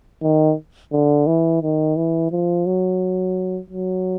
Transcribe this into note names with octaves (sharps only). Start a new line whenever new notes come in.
D#3
D3
E3
D#3
E3
F3
F#3
F#3